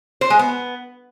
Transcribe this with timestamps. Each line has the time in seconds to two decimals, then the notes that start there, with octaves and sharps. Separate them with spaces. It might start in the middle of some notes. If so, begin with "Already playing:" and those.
0.21 C5
0.30 G#3
0.39 B3